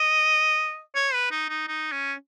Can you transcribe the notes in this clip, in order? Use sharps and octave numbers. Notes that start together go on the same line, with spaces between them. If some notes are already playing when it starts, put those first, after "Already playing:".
Already playing: D#5
C#5
B4
D#4
D#4
D#4
C#4